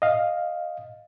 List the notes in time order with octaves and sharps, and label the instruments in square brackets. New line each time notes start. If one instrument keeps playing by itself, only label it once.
[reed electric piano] D#5 F5